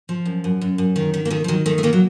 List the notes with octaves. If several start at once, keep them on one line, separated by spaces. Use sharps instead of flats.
F3
F#2
F#2
F#2
F#2
D#3
D#3
A#3
D#3 A3
F3
D#3 F#3
D#3 A3
A3
D#3 A#3
F#3